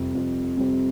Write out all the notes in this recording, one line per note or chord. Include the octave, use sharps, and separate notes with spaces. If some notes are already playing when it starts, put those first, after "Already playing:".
Already playing: F2 C3 G3 C4
F2
C3 G3 C4